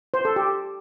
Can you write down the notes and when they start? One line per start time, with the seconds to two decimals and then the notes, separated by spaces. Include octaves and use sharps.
0.14 C5
0.25 A4
0.36 G4